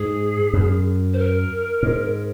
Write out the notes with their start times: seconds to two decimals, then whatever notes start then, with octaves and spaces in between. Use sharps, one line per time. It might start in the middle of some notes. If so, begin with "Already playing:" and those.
Already playing: G#2 G#4
0.53 F#2
1.13 C5
1.18 A#4
1.83 G#2